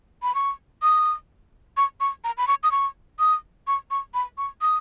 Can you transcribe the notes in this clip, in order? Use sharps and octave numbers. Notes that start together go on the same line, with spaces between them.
B5
C#6
D#6
C#6
C#6
A#5
B5
C#6
D#6
C#6
D#6
C#6
C#6
B5
C#6
D#6